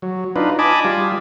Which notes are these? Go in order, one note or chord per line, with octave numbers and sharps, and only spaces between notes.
F#3
D4 D#4 F4 B4
D#5 G#5 A5 B5 D6
G3 F4